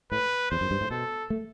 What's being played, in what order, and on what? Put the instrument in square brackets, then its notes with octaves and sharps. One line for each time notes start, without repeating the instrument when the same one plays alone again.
[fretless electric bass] A2 [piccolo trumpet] B4
[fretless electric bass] E2 [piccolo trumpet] C5
[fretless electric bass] F#2
G2
A2
[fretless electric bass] B2 [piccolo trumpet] A4
[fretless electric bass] A3